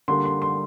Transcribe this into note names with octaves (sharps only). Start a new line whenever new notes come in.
D3 G3 A#3 C6
C6
C6